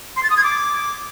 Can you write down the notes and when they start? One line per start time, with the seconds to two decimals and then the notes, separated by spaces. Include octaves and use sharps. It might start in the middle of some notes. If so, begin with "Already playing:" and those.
0.16 C6
0.23 A6
0.30 D#6
0.37 G#6
0.44 D6